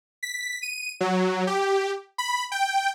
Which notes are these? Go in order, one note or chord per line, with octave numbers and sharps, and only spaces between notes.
B6
D#7
F#3
G4
B5
G5